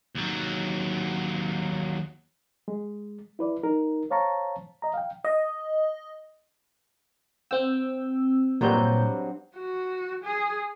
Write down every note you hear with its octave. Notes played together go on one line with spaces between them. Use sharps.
D#2 F#3
G#3
E4 B4 D5
D#4 A#4
C5 C#5 F5 A5 A#5 C#6
D#5 A#5
F5 G5
D#5
C4 G5 E6
G2 A#2 F#3 G3 C4 G6
F#4
G#4